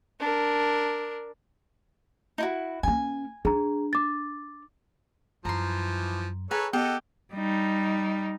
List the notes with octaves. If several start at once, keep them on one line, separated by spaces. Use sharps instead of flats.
D4 A#4
D#4 E4 F#4
A#3 C#4 G#5
D4 G#4 A#5
D6 A6
F#2 E3 F3 A#5 C6
G#4 A4 B4 C#5 G#5 A#5
B3 G4 A4 D#5 F#5
G3 D#4